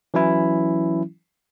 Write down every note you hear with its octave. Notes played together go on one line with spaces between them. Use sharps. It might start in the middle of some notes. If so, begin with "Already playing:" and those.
E3 F#3 C#4 E4